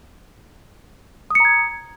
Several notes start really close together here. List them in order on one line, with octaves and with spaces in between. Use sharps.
D#6 C#7 A#5 G#6